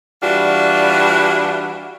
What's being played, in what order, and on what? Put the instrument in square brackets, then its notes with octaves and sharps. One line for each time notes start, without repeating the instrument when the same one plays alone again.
[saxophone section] E3 G3 D4 F4 F#4